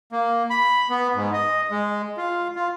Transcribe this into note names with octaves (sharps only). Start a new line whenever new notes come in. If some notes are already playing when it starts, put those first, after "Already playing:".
A#3
B5
B3
G#2
D#5
G#3
F4
F4